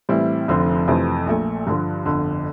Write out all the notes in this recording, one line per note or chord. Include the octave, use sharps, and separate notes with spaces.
A2 E3 G3 C4 E4
F1 F2 D3 F3 C4
F2 C3 E3 A3 C4
A#1 A#2 A3
G2 D3 F3
G1 F2 D3